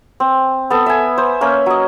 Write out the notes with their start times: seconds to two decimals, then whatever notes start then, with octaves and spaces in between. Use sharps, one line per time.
0.20 C4
0.70 B3 A4
0.86 E5 G#5
1.18 C5
1.41 A#3 C#4 E5
1.66 F#3 D#5